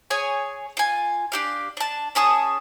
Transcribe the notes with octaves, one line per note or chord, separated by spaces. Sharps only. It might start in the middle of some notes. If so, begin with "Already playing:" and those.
G#4 C#5 G#5
F4 G#5
D4 G4 F5
D4 A5
C#4 G#4 A5 D#6